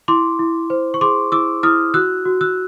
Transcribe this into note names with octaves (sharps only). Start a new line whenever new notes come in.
E4 C6 D6
E4
C5
C#6
G#4 C6 D6
E4 D6 E6
E4 D#6 F6
F#4 E6 F#6
F#4
E6 F#6